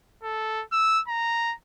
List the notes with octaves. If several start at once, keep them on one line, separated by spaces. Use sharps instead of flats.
A4
E6
A#5